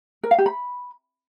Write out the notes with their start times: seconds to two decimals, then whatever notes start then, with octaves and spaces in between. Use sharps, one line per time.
0.23 A#4
0.31 F5
0.38 G4
0.46 B5